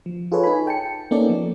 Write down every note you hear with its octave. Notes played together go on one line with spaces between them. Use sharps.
F3
F4 G#4 A4 B4 C#5
D#4 G#5 B5
G5 A5 C#7
A#3 B3 C#4 D#4 A4 D5
F3